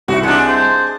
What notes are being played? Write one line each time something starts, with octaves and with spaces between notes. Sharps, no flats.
C2 C4 E4 F#4
G#3 D4 F#5
C5